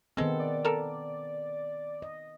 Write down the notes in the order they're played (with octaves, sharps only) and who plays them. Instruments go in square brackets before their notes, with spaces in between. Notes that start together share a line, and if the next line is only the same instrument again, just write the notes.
[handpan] D#3 B3 C4 [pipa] G#3 A4
[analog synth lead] D5
[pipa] A4 A#4
[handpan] D#5